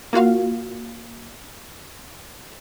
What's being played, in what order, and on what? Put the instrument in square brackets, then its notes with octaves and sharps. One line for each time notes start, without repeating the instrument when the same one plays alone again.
[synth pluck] A#3 F4 F#4 F5